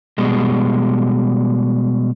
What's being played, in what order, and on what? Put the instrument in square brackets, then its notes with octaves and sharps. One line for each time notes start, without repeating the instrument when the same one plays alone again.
[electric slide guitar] B2 G3 G#3